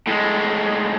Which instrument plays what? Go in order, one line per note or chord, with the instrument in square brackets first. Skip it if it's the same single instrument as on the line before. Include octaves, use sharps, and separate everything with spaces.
[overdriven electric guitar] A2 G#3